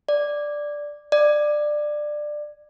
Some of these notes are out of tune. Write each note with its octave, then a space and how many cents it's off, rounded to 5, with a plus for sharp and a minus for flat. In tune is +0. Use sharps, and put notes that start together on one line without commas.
D5 +0
D5 +20